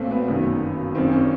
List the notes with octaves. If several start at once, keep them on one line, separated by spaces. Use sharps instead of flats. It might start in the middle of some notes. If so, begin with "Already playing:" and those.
Already playing: B1 A#2 A3 A#3 C4
B3
G1 F#2 D#3
G#1 F#2 D#3 C4
C#4